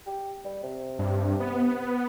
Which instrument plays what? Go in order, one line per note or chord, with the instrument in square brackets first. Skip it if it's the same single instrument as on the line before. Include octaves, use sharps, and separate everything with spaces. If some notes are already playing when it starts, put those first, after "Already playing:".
[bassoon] G4
G3
C3
[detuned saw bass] G2
B3